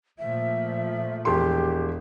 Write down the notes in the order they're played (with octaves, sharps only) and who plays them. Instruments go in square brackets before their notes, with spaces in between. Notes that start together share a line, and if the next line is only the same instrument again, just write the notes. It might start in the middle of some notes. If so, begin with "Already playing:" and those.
[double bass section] A#2 F3 A3 [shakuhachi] E5
[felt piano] E1 C6 [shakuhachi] G4